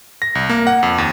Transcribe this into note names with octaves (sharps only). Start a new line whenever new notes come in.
A#6
C2
A#3
F#5
F2
D#2